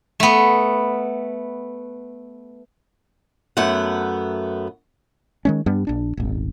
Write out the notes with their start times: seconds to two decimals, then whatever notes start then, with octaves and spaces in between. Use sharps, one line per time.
0.20 A3 B3
3.57 F#2 A3 B3 F#5
5.45 D#3 G#3 C#4
5.66 G2 G3 B3 D4
5.87 A#1 D4
6.17 D#1 G#1